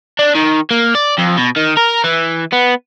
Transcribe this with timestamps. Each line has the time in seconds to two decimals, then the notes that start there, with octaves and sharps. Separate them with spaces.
0.19 D4
0.35 D#3
0.71 A#3
0.95 D5
1.19 F2
1.38 B2
1.57 D#3
1.77 A#4
2.04 E3
2.53 B3